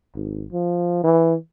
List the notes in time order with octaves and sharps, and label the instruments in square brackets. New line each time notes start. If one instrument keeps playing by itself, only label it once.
[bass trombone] G#1
F3
E3